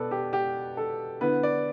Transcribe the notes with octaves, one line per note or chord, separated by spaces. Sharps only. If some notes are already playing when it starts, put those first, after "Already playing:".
Already playing: B2 B3 A4 B4 D5
G4
G4
A4
D3 B3 E4 B4
D5